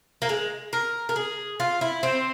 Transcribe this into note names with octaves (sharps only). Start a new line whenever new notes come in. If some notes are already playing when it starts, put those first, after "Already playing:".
A#3
G#3
A#4
A#4
G#4
F4
E4
C4